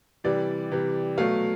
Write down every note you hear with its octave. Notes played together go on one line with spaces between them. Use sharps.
C3 E3 G3 D5
C3 E3 G3
B2 F#3 A3 F5